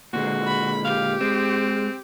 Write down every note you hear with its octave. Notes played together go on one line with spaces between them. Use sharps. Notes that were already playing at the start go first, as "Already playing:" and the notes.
A#2 D3 G#3 F#4
B5
G4 F5
G#3 C4